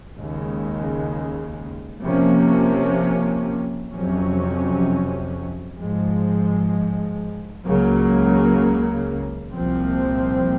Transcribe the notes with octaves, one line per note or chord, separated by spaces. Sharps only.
D#2 C#3 G#3
C3 F3 A#3 C#4
F2 C3 F#3 C#4
G#2 F3 G#3
C#2 C#3 F#3 A#3
C2 A#2 F3 C4